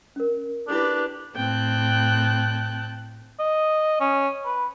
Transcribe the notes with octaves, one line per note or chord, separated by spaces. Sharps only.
C#4 A#4
D4 E4 F#4 G4 A4 B4
A2 C4 G5 A5 F#6
D#5
C#4
B4